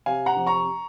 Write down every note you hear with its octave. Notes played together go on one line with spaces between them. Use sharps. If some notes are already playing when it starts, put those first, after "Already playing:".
C3 F5 G#5
F#5 A#5
F2
A#5 C#6